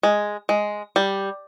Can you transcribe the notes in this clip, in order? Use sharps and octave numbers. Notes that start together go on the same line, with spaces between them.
G#3
G#3
G3